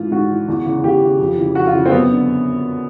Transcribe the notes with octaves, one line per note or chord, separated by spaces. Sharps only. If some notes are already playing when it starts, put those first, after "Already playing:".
Already playing: G#2 E3 F4
G#2 F#4
E3
E2
C#3 E3
E2 G4
C#3 E3
F2
C#3 E3
F2 F#4
F4
C#3 E3
C4
F#2 B3
D3